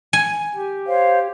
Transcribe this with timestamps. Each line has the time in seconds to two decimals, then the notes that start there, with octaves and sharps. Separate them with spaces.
0.13 G#5
0.55 G4
0.87 C5 C#5 F5